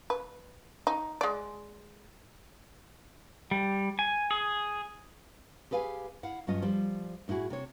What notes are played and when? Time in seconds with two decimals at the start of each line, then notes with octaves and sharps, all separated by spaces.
0.10 B4
0.87 D#4
1.21 G#3 D5
3.51 G3
3.99 G#5
4.31 G#4
5.71 G4 G#4 B4 F5 F#5 G#5
6.23 E4 F5 F#5
6.47 G2 F#3 C#4 F4 D#5
6.62 F3 G3 C5
7.28 A2 D#4 E4 F#4 G#4
7.50 C3 C4 C#5